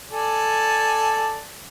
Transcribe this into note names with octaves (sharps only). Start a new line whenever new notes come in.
A4 D5 G#5